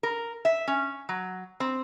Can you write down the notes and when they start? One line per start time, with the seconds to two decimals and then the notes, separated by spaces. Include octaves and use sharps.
0.03 A#4
0.45 E5
0.68 C#4
1.09 F#3
1.60 C4